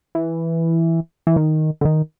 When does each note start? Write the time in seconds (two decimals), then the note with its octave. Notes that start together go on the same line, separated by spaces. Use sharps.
0.15 E3
1.27 E3
1.36 D#3
1.81 D3
1.85 D#3